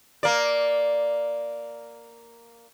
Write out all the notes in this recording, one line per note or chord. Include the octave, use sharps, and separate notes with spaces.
A#3 D5